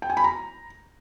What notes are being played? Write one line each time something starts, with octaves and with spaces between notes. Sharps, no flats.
G5
G#5
B5
A#5